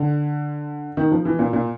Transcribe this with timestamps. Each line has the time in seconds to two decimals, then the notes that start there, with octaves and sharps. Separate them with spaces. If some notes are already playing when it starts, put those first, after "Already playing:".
Already playing: D3
0.97 D#3
1.12 F3
1.25 E3
1.39 A#2
1.53 A#2